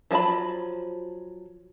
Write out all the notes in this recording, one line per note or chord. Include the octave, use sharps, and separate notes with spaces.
F3 F#3 F4 A5 B5